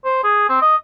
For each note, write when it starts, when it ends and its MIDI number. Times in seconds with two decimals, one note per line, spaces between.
0.05 0.22 72
0.23 0.46 68
0.49 0.58 60
0.62 0.76 75